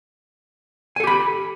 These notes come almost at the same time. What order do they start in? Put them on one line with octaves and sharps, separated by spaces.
G#5 A4 G4 B5